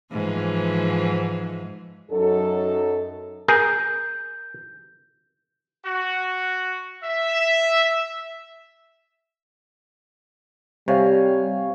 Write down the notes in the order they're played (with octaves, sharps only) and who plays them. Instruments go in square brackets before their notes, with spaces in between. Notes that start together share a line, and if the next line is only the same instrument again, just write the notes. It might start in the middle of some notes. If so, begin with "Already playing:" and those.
[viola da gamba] G#2 E3 F3
[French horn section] F#2 F#3 D#4 A4
[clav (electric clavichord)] G#4 A#4 [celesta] G6
[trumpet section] F#4
E5
[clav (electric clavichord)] C3 [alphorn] G3 [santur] C#5 F5 G#5